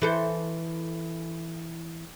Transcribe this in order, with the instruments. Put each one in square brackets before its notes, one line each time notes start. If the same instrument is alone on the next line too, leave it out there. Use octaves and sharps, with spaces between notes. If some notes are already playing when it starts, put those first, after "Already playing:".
[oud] E3 A4 C5